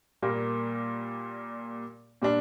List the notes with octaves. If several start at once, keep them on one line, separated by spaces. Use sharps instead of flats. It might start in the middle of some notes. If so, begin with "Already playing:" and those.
A#2 G3 A#3
A#2 G3 D4